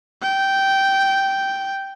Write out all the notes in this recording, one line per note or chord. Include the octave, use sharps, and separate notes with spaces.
G5